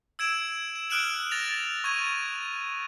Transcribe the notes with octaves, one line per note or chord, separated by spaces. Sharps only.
E6 G#6 D7 E7
E7
D#6 F6 F#6 D7 E7 F#7
A6 A#6 F7
C#6 G#6 D#7